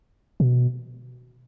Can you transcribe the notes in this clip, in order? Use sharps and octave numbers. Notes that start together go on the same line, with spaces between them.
B2